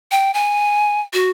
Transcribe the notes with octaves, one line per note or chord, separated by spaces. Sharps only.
G5
G#5
F#4